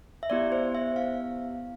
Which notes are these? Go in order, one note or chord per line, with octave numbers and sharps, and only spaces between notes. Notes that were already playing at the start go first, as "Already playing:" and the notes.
E5
B3 E4 G4 D5
C5
E5
F5